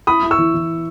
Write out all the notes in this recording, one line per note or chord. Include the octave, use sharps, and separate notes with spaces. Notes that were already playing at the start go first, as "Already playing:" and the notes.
E4 B5 D#6
E4
C#6 E6
E3
E3